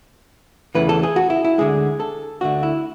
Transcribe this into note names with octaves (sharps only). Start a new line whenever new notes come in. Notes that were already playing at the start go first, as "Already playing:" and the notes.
E2 C#3 E3 A3 B4
A4
G#4
F#4
E4
E4
D2 D3 G#3 G#4
A4
D2 D3 A3 F#4
E4